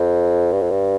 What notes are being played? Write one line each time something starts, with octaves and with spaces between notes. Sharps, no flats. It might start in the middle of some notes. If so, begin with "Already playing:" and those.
Already playing: F2
G2
F2
G2